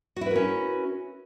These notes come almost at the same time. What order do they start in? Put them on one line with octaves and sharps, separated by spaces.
F#4 E4 B4 A#4 C#4